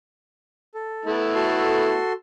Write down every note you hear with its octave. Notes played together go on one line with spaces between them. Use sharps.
A4
A3 B3 E4
F#4 A4 C6